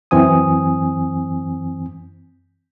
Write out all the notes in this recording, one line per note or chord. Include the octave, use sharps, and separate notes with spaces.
F#2 E3 C4 G#5 D#6